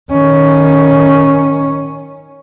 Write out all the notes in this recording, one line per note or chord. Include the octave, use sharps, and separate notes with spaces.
D#3 C#4